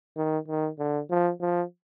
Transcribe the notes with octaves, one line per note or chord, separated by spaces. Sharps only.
D#3
D#3
D3
F3
F3